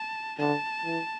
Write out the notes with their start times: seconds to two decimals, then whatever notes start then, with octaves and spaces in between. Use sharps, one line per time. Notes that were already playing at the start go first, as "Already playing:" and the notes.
Already playing: A5
0.38 D3 A5
0.84 E3